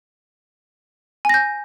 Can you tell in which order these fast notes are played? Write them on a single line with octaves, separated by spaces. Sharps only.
G#5 A#6 G6